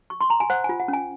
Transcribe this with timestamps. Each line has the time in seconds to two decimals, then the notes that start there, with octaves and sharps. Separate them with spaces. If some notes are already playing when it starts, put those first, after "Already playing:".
0.10 C#6
0.21 C6
0.30 A#5
0.40 G#5
0.50 C5 F#5
0.64 G#5
0.69 F4
0.80 F#5
0.88 C#4
0.93 G#5